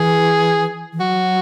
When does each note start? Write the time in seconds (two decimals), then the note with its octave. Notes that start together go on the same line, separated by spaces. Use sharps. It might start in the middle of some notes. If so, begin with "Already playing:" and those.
Already playing: E3 G#4
0.93 E3
1.00 F#3 F#4